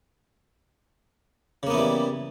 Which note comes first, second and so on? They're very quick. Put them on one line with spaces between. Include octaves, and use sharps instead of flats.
C#3 A#3 B3 E3 G3